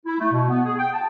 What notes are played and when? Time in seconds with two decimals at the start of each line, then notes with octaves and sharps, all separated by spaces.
0.06 E4
0.20 A3
0.32 B2
0.49 B3
0.65 G#4
0.79 G5
0.93 A5